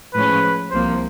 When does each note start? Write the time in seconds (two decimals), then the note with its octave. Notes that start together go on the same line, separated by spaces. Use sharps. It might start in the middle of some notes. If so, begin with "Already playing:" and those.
0.14 A2 F3 G#3 C#4 B4
0.71 C2 C3 F3 A#3 C5